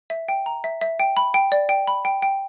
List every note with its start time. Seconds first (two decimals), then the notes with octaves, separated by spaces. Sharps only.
0.10 E5
0.28 G5
0.46 A#5
0.64 E5
0.81 E5
1.00 G5
1.17 B5
1.34 G5
1.52 D5
1.69 G5
1.87 B5
2.05 G5
2.22 G5